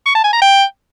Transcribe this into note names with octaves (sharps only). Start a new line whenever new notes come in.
C#6
A5
G#5
A#5
G5